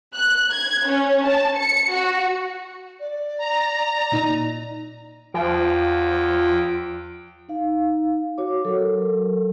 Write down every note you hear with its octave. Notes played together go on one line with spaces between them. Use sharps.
F#6
G#6
C#4
A5
C#7
F#4
D5
A#5
A#2 D#4
E2 F3 G5
D#4 F5
F#4 C#5 D6
F#3 A4 A#4